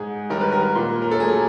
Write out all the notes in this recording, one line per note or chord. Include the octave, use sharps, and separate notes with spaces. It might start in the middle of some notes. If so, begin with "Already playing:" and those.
Already playing: G#2 G#4
D#3 G3 A#4
B4
A#4
A#2
A#4
A4
F#3 A3 G#4